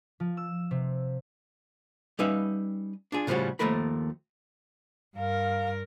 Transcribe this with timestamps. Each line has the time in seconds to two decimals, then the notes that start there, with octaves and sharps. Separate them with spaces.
0.20 F3
0.37 E6
0.71 C3
2.19 G3 C#4 D#4 B4 E5 F5
3.12 D4 F4 G#4
3.27 A2 C#3 F3 G3 C#4 F#4
3.59 D#2 B2 F3 A3 A#4 B5
5.16 G2 A#4 F5